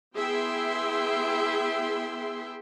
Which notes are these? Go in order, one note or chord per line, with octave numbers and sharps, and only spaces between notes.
B3 E4 G#4 E5 G5 C6